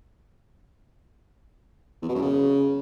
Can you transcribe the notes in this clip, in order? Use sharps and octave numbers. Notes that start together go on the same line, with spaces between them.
E2
B2
F#2
C#3